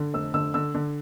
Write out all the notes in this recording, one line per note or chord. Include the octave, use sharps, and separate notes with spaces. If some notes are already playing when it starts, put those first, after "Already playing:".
Already playing: D3
F1 E6
D3 E6
D3 E6
D3